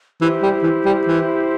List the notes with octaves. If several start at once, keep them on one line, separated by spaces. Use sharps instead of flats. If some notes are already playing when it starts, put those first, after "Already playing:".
E3 E4 G4 C5
G3
E3
G3
E3